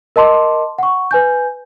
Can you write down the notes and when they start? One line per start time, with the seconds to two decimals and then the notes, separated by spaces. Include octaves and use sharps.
0.16 A#4 D#5 A5 C6 D6
0.78 F#5 C#6
1.11 B4 G#5 G6